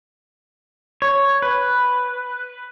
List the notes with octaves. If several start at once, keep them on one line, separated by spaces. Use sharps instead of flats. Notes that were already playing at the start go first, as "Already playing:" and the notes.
C#5
B4